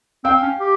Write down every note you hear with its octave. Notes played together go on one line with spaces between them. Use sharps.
C4 F5 G5
C#4
G4